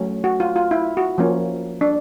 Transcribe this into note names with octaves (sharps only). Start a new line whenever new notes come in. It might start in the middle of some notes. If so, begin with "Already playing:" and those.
Already playing: F#3 A3 C#4
F#4
F4
F4
E4
F#4
F3 A#3 C#4
D4